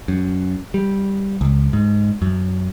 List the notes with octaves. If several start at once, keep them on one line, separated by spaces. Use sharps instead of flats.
F#2
G3
C#2
G#2
F#2